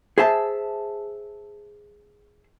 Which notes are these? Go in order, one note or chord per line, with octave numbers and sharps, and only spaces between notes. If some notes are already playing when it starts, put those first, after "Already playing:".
G#4 C5 E5 A5